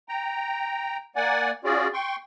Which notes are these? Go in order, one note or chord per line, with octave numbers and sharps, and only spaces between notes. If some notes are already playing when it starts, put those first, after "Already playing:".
G5 A#5
A#3 D5 F#5 G#5
C#4 F4 F#4 G#4 D5
G5 C6 C#6